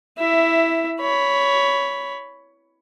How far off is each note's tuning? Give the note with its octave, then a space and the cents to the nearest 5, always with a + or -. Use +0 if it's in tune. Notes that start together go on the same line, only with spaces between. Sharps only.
E4 +0 E5 +10
C#5 +15 B5 +0